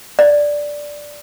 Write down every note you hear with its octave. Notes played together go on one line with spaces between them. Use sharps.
D5